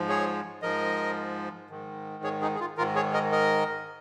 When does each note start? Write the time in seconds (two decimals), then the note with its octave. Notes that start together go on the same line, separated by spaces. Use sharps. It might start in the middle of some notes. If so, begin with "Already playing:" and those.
Already playing: G#2 F3
0.09 G#4 C#5
0.62 G#2 F3 A#4 D#5
1.70 G#2 D#3
2.24 G#4 C#5
2.42 D#4 G#4
2.55 G#4
2.60 F4
2.78 G#2 D#3 F4 A#4
2.95 G#4 C#5
3.13 A#4 D#5
3.32 A#4 D#5